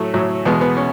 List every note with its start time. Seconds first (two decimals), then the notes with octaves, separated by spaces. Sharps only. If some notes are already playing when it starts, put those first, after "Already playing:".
Already playing: A2 F#3 A3
0.14 A2 F#3
0.45 E2 B2 G#3 B3
0.61 B3
0.77 C#4